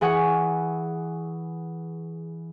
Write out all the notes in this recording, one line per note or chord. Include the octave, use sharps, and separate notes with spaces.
E3 G#4 F#5 C#6